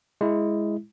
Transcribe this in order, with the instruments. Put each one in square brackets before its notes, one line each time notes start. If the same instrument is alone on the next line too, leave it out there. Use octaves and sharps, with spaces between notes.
[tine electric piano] G#3 E4